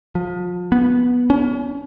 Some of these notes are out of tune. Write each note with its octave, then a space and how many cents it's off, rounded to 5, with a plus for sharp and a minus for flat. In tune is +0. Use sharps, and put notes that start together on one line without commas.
F3 +30
B3 -10
C#4 +35